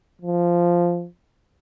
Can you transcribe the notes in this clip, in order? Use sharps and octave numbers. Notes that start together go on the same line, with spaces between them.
F3